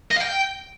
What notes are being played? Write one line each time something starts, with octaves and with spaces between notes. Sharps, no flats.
D#5
F5
G5